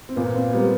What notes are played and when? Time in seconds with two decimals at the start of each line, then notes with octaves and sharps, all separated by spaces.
0.09 C4
0.16 A#2 B3
0.35 C4
0.53 G3 A#3 B3